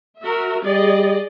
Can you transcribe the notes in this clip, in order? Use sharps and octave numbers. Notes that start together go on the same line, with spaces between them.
F#4 A#4 E5
G3 G#4 D5 D#5